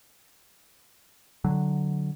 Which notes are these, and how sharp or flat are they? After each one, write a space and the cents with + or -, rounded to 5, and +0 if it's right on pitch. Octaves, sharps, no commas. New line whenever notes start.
D3 +0 F#3 +0